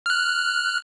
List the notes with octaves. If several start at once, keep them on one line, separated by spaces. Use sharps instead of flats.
F6 F#6